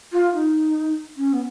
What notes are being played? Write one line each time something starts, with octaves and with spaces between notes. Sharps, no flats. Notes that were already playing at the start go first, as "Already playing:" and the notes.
F4
D#4
C#4
B3